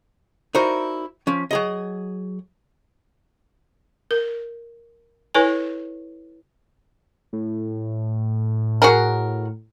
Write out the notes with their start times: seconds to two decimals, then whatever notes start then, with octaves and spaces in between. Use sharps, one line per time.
0.55 D#4 E4 F#4 A#4 C5 D5
1.27 F3 C#4
1.51 F#3 G#4 D#5
4.11 A#4
5.34 E4 A4 B4 C#5 G#5
7.33 A2
8.82 F#4 G#4 A#4